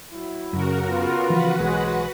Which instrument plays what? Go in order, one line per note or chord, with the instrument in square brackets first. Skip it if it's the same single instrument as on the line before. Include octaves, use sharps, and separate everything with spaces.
[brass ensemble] F#3 E4
[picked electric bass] F#2 [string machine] C#3 F#4 A#4
[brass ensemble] B3 F4
[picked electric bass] E3 F3 [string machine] F#4 B4 F#5
[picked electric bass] B1 E3 [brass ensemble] F#3 G#3